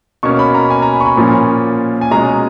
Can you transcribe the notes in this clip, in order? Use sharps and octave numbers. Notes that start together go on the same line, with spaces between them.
B2 A#3 C#4 C#6
B5
A#5
G#5
A#5
B5
C#6
B5
A#2 F3 A#3 C#4
G#5
B2 G#3 C#4 A#5